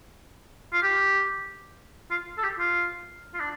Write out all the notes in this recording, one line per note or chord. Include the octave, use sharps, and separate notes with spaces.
F4
G4
F4
A4
G4
F4
F4
D4